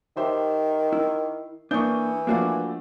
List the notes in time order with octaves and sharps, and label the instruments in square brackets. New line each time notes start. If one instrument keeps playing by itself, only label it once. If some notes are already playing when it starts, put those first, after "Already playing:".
[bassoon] D#3 [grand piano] G4 C5 E5
[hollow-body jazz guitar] E4
[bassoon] E3 [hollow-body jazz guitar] A#3 D4 [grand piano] C#6 D#6 G6
[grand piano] F3 A3 D4 [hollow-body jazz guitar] A#3 F#4 F5